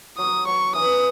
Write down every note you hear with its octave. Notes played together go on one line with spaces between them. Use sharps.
F#3 D#6
F#3 C#6
E3 D#6